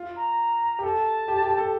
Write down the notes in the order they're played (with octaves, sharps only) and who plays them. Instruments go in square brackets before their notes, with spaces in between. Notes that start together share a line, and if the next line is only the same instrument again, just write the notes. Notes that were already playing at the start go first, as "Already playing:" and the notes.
Already playing: [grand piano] F4
[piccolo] A#5
[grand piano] G4
[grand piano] A4 [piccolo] A5
[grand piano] G4
G4
A4